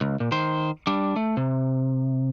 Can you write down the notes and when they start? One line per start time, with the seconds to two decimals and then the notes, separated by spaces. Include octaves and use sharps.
0.01 C#2
0.20 A#2
0.32 D#3 C5
0.87 G3 D4
1.16 A3
1.37 C3